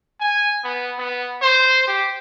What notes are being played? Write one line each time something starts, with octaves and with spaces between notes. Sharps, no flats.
G#5
B3
B3
C5
G4